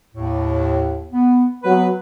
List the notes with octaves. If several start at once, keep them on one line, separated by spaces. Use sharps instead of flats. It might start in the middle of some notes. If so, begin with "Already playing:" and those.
D#2 A2
B3
F#3 B3 B4